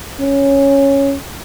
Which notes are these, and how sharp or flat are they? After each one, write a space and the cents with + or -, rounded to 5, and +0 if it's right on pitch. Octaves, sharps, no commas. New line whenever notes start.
C#4 -5